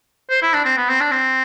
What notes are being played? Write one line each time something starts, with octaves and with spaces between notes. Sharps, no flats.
C5
E4
D4
C4
B3
C4
D4
C4